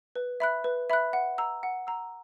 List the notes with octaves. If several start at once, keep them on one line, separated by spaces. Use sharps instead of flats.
B4
E5 B5 F#6
B4
E5 B5 F#6
F#5
A#5 E6
F#5
A#5 E6